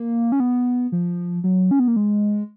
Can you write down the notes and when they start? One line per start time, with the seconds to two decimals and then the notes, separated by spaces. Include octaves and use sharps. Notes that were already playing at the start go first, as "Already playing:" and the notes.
Already playing: A#3
0.32 C#4
0.40 B3
0.92 F3
1.44 F#3
1.71 C#4
1.79 B3
1.88 A#3
1.96 G#3